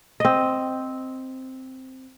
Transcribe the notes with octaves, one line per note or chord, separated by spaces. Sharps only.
C4 D#5